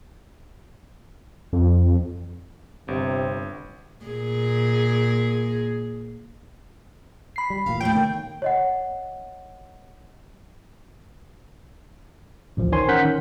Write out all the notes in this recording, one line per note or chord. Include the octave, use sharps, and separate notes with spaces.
F2
G1 C3
A#2 G#4
B5 C7
G3
E1 A1 A#2 F5
A3 C#5 G5
B2 D#3 A#3
C#5 D#5 F#5
A1 D2 F3
D#3 C5 C#5 G#5 C6
C#4 A#4 F#5 F#6 G6 B6
D#3